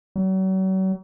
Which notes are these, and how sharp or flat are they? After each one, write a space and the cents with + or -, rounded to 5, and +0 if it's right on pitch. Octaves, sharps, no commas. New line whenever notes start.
F#3 +40